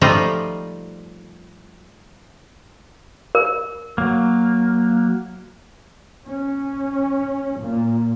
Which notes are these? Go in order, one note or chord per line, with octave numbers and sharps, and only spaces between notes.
F3 G3 A3 D#4 F4
A#4
F#3 A#3
C#4
A#2